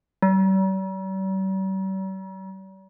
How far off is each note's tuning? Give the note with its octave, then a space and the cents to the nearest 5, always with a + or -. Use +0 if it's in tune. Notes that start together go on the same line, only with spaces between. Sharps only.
G3 -45